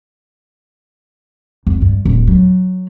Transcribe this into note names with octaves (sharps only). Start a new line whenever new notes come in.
F1
G2
D#1
F#3